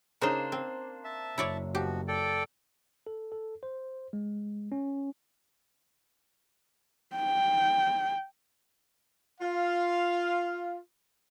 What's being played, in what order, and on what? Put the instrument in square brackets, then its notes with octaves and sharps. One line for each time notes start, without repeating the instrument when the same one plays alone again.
[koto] C#3 D#4 [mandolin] A#3 D4 C5
[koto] C4
[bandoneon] E5 A5
[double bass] F#1 [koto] E4 C#5 D5
[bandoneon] B2 F3 F#4 [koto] G4
[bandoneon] A4 D5 G5
[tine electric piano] A4
A4
C5
G#3
C#4
[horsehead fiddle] G5
[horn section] F4 F5